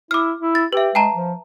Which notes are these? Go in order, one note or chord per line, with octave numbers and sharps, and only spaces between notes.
E4 D6 F6
E4
A6
G4 B4 E5
G#3 G5 A5 A#5
F3